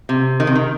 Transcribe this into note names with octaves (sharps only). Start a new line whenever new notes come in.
C3
D#3
C3
D#3